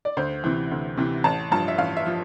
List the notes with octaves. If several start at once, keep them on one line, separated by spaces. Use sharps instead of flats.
D5
D2 C5
C3 E3
D2
C3 E3
A1 A5
G2 F3 A5
E5
A1 F5
E5
F3